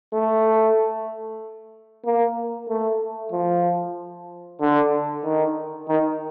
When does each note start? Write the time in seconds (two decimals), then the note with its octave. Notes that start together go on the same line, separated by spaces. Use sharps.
0.13 A3
2.05 A#3
2.69 A3
3.32 F3
4.61 D3
5.24 D#3
5.88 D#3